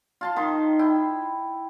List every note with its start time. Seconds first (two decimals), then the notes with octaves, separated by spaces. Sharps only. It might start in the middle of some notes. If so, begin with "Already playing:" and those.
0.21 F4 A5 C6
0.36 D#3 D#4 C6
0.79 E4 G5